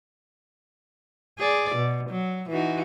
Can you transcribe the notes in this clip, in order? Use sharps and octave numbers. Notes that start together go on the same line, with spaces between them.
G#4 D5
B2
F#3
E3 D#4 F#4